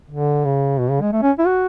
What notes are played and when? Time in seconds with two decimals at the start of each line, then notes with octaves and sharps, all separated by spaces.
0.11 D3
0.45 C#3
0.79 B2
0.90 C#3
1.01 G#3
1.13 A3
1.22 C#4
1.39 E4
1.47 F#4